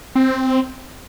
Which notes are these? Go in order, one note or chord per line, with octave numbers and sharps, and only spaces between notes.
C4